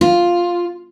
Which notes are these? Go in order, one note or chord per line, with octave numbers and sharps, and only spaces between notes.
F4